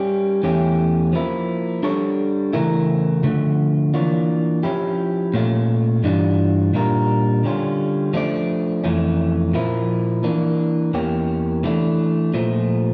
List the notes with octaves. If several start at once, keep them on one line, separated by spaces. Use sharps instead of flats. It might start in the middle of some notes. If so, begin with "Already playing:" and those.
Already playing: G3 C#4 G4
E2 E3 A3 C#4 G4
F3 A#3 E4
G3 D4 A4 C#5
C#3 E3 A3 E4 A#4
D3 F3 A3
E3 A#3 D4 F4 C#5
F3 C#4 E4 G4
A#2 A3 C#4 F4
G2 E3 G3 D4 F4
A#2 G3 D4 F4 A#4
D3 G3 C#4 F4
F3 A3 D4 G4 D5
F2 E3 A3 C#4
A#2 F3 A#3 E4
E3 A#3 D4
E2 E3 A#3 C#4 G4
E3 A3 D4
A#2 F3 A3